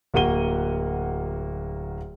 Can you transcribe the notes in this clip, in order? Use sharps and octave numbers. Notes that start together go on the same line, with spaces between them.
D1 A#3 F#4 F#5 D#7 G7